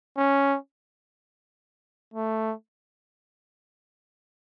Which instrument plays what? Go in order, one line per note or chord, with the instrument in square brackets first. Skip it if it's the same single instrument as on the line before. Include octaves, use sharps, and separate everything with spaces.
[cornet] C#4
A3